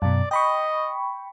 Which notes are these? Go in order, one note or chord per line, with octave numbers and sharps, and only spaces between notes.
F#2 B2 D5
D#5 G5 B5 C#6